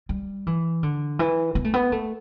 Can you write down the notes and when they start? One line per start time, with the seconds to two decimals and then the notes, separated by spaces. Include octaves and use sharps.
0.09 G3
0.47 E3
0.83 D3
1.19 E3
1.55 B3
1.65 A3
1.74 B3
1.92 A3